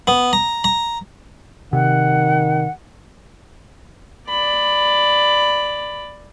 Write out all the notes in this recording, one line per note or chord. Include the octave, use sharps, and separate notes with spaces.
B3
A#5
A#5
C3 D#3 F#5
D5 B5